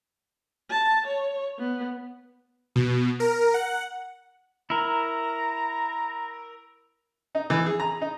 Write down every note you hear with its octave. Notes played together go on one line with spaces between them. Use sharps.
A5
C#5
B3
B2
A#4
F#5
E4 A#4 A#5
D#4
E3
G#4
A#5
D#4